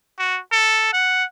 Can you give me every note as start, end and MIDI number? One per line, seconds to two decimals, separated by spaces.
0.19 0.40 66
0.52 0.90 69
0.93 1.24 78